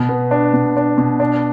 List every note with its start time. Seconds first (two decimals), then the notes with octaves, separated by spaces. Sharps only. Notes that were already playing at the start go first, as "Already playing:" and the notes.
Already playing: B2
0.09 B3
0.31 D4
0.53 B2
0.77 D4
0.98 B2
1.20 D4